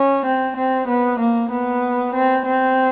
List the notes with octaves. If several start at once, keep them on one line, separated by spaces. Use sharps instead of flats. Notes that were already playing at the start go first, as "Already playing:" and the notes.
Already playing: C#4
C4
C4
B3
A#3
B3
C4
C4